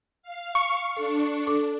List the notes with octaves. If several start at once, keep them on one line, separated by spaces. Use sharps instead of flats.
F5
C#6
D4 A4
A4 D6